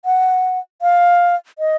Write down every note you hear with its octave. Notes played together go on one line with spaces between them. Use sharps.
F#5
F5
D#5